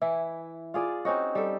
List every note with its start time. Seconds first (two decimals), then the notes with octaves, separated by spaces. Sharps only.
0.02 E3 E4
0.74 F4 G#4 D5
1.05 C4 C#4 D#4 F#4
1.35 G3 A4